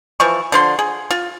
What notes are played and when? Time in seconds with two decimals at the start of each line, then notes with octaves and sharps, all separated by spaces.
0.20 E3 F3 C#6
0.52 D3 F3 C6
0.79 G#4
1.11 F4